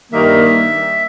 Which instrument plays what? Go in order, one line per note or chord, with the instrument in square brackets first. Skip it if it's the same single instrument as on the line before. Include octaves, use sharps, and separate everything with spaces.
[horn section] G2 D#3 G3 A#3 [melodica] E5